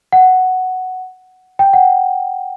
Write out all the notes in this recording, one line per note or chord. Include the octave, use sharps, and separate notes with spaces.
F#5
G5
F#5